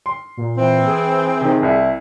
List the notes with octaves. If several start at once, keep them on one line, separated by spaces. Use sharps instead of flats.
C6
A#2
E3 C4
G#4
C3 D#3
C2 E4